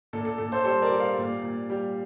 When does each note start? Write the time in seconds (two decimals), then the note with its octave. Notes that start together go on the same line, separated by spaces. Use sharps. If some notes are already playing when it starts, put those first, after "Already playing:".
0.13 A#2 A4
0.25 A4
0.38 A#2 A4
0.52 A4 C5
0.64 G3 A4 C5
0.82 A#4 D5
0.90 G3
0.99 D5 F5
1.18 A#2
1.43 A#2
1.70 G3